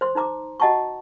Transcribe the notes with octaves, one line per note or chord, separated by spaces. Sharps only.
C5 C6
D#4 C5 A#5 D6
F#4 D#5 F#5 A5 A#5 C#6